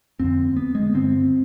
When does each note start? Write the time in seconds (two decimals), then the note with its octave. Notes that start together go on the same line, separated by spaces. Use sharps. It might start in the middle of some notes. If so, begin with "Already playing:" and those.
0.20 F2 D3 C4
0.57 B3
0.75 G#3
0.93 G2 D3 C4